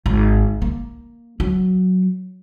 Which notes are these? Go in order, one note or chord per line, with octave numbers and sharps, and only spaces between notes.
G#1
A#3
F#3